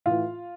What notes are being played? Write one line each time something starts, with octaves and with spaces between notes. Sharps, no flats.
A2 E3 F4 F5